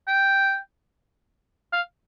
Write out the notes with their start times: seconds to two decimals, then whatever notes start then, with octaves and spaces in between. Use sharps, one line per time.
0.08 G5
1.73 F5